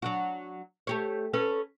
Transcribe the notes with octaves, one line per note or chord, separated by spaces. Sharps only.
F#3 D4 F#4
A3 G4 C#5
C#4 A4 B4